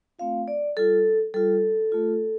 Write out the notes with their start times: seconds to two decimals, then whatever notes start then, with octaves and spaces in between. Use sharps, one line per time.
0.19 A3 C4 F4 F5
0.48 D5
0.77 G3 F4 A4
1.34 G3 F4 A4
1.92 A3 F4